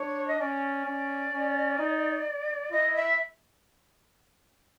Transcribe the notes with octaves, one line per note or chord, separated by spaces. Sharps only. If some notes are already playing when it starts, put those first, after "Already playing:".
Already playing: D4 C#5
D#5
C#4 D5
C#4
C#4
D#4
E4 D#5
E5